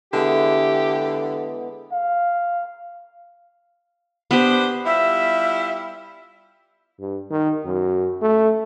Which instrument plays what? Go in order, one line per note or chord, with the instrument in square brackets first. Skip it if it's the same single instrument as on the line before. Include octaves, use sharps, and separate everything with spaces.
[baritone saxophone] D3 [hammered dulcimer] E3 G#3 B3 [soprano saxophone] G4
[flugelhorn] F5
[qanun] B3 G4 [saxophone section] D4 B4 C5
[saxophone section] G3 E4 F4 [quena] E5
[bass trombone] G2
D#3
F#2
A3